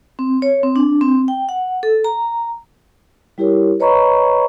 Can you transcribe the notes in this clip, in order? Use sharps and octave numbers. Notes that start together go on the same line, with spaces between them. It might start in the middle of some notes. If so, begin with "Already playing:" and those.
C4
C#5
C4
D4
C4
G5
F#5
A4
A#5
G3 E4 G4 A#4 C#5
B4 C#5 D#5 A#5 B5 C#6